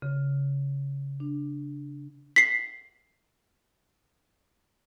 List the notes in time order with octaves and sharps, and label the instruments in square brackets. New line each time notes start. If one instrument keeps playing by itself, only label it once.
[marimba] C#3
D4
[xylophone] B6 C7